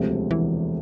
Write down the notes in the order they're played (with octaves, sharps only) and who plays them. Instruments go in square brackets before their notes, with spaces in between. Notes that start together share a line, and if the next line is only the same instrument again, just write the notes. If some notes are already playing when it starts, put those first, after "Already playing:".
Already playing: [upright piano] E1 D2 C3 F3
[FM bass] E3